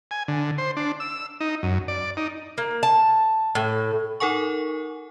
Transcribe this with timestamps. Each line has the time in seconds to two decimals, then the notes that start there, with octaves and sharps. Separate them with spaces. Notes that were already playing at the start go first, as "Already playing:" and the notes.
0.11 G#5
0.28 D3
0.58 C5
0.77 D4
1.00 E6
1.40 D#4
1.63 F#2
1.88 D5
2.17 D#4
2.58 A#3
2.83 A5
3.55 A2
4.20 D#4 A4 A#4 F#5 G#5 C#6